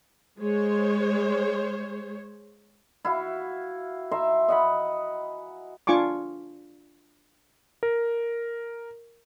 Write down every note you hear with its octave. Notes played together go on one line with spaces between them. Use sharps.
G#3 C5 C#5
E4 F#4 F5
E5 A#5 C6
D#5 F#5 G#5 B5
D4 F4 G#5 C#6 D6
A#4